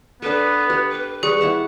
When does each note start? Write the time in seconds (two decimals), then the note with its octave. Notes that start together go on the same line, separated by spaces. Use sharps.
0.22 B3 D4 A4 B4
0.70 G4
0.90 B4
1.23 G3 G#4 C#6
1.41 E4 F#5 A5